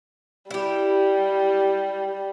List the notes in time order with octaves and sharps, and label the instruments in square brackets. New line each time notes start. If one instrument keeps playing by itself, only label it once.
[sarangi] G3 [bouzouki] E4 G4